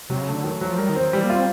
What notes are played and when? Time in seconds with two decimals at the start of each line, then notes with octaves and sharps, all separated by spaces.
0.10 C3 F#3
0.21 C#3
0.27 A3
0.32 D3
0.44 D#3 F#3
0.55 E3
0.61 F#3
0.68 F3
0.78 G3 A#4
0.89 D#3
0.96 C4
1.01 D#3
1.12 E3 G3
1.24 A#3
1.30 F4
1.35 C4